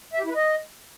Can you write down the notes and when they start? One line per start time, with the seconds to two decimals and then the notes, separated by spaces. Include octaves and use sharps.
0.13 E5
0.19 G4
0.24 E4
0.30 B4
0.35 D#5